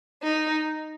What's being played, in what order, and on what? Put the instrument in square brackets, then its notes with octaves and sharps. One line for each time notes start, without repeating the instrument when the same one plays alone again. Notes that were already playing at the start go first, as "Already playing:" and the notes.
[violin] D#4